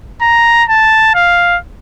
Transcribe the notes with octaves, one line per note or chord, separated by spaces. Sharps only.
A#5
A5
F5